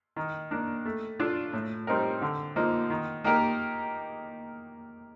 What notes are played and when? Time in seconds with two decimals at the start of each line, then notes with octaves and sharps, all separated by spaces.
0.16 D#3
0.51 A#3 D4
0.85 A3
1.19 D4 F4 A4
1.53 A2
1.87 G3 C4 D#4 A#4
2.22 D3
2.56 F3 A#3 D#4
2.90 D#3
3.24 A#3 D#4 G4 A#4